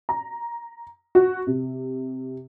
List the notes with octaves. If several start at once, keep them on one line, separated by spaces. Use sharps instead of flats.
A#5
F#4
C3